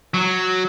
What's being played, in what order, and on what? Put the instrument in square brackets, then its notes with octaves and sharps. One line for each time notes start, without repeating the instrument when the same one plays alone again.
[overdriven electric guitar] F#3